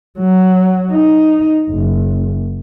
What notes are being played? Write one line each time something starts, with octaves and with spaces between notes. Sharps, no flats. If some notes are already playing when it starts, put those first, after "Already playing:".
F#3
D#4
F#1